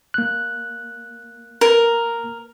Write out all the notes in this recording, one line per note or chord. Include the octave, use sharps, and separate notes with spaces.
A#3 F#6
A#4